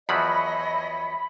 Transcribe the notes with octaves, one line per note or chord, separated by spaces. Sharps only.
E2 F3 F#3 C#5 D#5 E5 B5